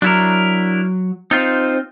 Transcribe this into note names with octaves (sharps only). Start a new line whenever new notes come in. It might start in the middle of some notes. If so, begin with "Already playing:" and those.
F#3 D4 E4 A#4
C4 D#4 F4 C5